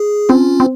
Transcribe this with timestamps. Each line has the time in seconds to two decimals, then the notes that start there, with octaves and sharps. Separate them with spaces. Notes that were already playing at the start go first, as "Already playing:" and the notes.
Already playing: G#4
0.29 C4 C#4 F4
0.60 C4